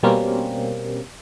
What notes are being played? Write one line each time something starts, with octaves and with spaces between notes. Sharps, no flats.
B2 G3 A#3 C4 C#4